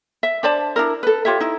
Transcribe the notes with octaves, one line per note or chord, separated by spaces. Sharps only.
E5
D4 C5 D5 A5
D4 E4 A#4
A4 B4
F4 G4 C#5 E5
D#4 E4